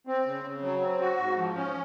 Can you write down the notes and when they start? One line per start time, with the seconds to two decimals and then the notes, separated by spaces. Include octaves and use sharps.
0.07 C4
0.26 C#3
0.44 C#3
0.63 F#3
0.81 C4
1.00 F#4
1.18 G#2
1.37 F3
1.56 C#4